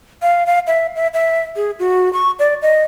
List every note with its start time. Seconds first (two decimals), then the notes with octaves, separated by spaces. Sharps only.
0.22 F5
0.47 F5
0.67 E5
0.96 E5
1.14 E5
1.56 G#4
1.79 F#4
2.13 C#6
2.39 D5
2.62 D#5